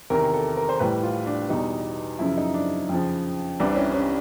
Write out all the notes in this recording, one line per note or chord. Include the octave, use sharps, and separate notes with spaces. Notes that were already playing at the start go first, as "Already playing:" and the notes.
E2 C3 D#3 A#4
A4
A#4
C5
A2 E3 G3 B4
F4
D4
E2 B2 G3 D#4
F#2 C#3 F3 E4
D#4
D4
F2 C#3 F3
C2 C3 E3 G3 D4
C#4
C#4